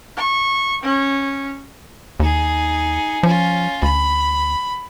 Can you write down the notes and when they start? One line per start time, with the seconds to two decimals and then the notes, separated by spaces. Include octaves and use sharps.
0.16 C#6
0.83 C#4
2.20 D#2 D#4 G#4
3.23 F3 C#4 F4
3.83 D2 B5